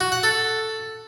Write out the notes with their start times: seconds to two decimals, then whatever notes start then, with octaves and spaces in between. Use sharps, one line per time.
0.01 F#4
0.12 F#5
0.23 A4